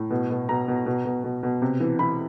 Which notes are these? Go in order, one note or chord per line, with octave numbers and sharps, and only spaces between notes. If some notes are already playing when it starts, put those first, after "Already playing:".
Already playing: A2
B2
B2
B2 A#5
B2
B2
B2
B2
B2
C3
E3
E3 B5